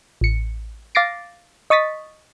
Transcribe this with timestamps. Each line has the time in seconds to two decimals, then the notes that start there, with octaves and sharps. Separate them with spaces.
0.21 A1 C#7
0.95 F5 D6 A6 A#6 C7 D7
1.70 D#5 C#6 D#6 A6 B6